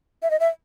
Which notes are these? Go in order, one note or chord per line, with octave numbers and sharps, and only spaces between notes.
E5
D#5
E5